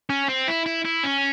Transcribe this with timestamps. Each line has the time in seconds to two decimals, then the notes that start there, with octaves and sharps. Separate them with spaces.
0.10 C#4
0.29 C4
0.48 E4
0.66 E4
0.85 E4
1.04 C#4